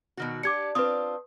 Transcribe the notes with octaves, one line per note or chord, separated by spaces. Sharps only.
B2 D#3 F#4
D4 G4 D6 G#6 C#7
C4 D4 F4 B4 D#6